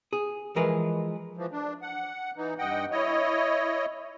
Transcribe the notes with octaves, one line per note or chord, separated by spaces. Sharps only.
G#4
E3 F3 G#3 A#4 B4
E3 F3
D4
F#5
E3 D#4
G2 D#5 F#5 G5
E4 C#5 D#5